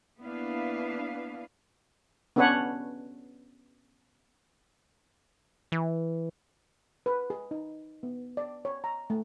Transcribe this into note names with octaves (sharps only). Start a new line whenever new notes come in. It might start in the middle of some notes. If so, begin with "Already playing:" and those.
A#3 B3 D4 E4 B4 F5
B3 C#4 D4 B4 C#5 F#5
E3
B4
G#4
D#4
B3
D5
C#5
A#5
A3